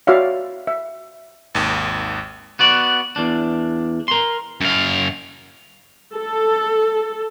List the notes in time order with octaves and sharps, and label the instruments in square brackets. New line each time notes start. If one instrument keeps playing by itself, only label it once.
[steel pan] F#4 C#5 D5 E5 F5
E5
[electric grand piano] G#1 D#2
[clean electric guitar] B3 F#4 D5
E2 D4
A#4 C6
[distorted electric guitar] F#2 F5
[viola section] A4